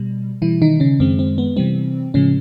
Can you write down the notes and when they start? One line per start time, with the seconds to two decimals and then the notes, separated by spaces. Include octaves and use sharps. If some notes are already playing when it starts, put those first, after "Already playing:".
Already playing: B2 G3
0.42 B2 E3 G3 E4
0.62 D#3 D#4
0.80 C#3 C#4
1.00 F#2 D#3 G#3 C4
1.19 C4
1.38 B3
1.56 C3 E3 G3 C4
2.14 A2 C#3 F3 G#3 C#4